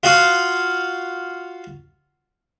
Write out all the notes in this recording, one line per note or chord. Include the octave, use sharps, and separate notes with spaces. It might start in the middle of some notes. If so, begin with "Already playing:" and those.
F4 F#4 F5 D#6